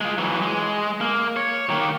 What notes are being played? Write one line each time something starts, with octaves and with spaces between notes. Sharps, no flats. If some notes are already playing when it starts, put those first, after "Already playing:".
G#3 F4
E3 F#3
G#3
A#3
C#5
D#3 A#3